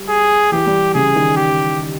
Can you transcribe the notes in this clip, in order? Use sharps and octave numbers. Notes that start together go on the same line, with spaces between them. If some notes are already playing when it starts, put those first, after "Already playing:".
Already playing: G3
G#4
E3 G4
G3
C#3 G#4
D#3
G4